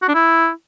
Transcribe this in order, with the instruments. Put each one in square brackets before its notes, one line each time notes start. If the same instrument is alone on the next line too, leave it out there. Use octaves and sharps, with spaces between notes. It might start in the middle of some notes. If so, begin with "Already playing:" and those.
[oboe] F#4
D4
E4